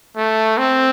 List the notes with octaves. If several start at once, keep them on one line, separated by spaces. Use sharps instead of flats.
A3
C4